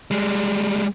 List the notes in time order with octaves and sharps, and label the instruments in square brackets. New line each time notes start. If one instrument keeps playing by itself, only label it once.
[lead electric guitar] G3 G#3